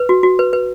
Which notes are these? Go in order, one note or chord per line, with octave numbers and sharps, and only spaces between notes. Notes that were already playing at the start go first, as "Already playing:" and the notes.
Already playing: B4
F#4
F#4
B4
B4